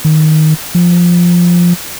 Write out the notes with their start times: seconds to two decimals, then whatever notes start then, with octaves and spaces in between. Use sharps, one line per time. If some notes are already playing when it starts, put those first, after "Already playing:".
0.05 D#3
0.75 F3